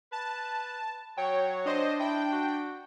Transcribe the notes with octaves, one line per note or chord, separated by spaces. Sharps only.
B4 A5
F#3 C#5 G5
D4 C5 D#5
E4 G5
F#4